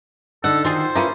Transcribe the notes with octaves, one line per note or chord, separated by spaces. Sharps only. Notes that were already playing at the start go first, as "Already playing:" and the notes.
D3 D#4 A4 F#5
D#3 F4 F#4 G#4 C5
A#3 C#4 E4 F4 B4